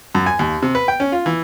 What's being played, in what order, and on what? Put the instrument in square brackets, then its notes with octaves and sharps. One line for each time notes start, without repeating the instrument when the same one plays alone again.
[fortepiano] F#2
G#5
D#2
C3
B4
G5
C#4
F4
E3